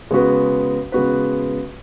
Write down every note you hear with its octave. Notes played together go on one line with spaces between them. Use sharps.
C#3 G#3 B3 F#4 B4
C#3 G#3 B3 F#4 B4